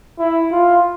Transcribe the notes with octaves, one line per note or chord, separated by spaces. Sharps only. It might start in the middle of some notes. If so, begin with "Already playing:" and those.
E4
F4